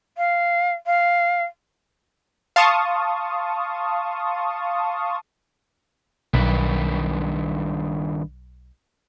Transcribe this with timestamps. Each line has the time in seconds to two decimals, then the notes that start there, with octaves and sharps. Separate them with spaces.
0.18 F5
0.87 F5
2.56 F5 A5 C6 C#6 D#6
6.34 B1 G2 D#3 B4